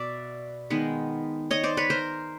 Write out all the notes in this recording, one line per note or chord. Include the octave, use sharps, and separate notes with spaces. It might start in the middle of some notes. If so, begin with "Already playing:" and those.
Already playing: B2 D5 E5
D#3 G#3 B3
C#5 D#5
C5 D5
B4 C#5
A#4 C5